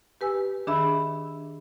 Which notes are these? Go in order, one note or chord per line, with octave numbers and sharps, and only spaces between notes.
G4 B4 G#5 E6
D#3 D4 G#4 E5 B5 E6